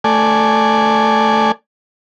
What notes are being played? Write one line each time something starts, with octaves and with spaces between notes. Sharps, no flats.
A3 D5 G#5